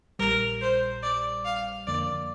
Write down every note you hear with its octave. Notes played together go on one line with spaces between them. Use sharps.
A#1 A#2 G3 A#4
C5
D5
F5
F2 D3 A#3 D5